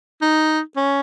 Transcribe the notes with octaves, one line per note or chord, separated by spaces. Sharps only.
D#4
C#4